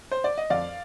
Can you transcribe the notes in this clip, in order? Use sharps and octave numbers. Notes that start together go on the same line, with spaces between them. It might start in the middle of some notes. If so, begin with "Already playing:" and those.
C5
D5
D#5
F2 D5 F5